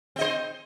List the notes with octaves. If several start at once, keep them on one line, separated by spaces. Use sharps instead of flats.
C4 C5 D#5